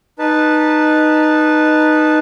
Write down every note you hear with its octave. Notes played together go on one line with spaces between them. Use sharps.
D#4 B4 A5